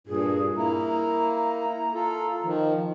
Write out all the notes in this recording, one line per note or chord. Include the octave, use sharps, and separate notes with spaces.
G2 A#2 G#4
A#3 E4 A#5
F4 A4
D#3 F3